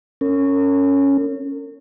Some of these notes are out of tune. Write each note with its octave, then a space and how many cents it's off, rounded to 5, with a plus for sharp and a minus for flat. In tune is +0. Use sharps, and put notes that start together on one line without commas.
C#4 +0 A#4 -40